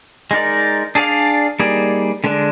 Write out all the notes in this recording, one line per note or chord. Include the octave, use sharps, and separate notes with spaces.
G#3 D#4 A#4 D5
D4 G#4 D5 F5
G3 A#3 D#4 G#4 D5
D3 G#3 D4